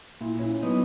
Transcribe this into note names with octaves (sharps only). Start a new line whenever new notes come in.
A#2 E4
C#4 E4
F#3 B3 D#4